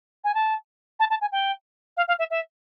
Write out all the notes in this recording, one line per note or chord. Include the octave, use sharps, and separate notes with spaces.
G#5
A5
A5
A5
G#5
G5
F5
F5
E5
E5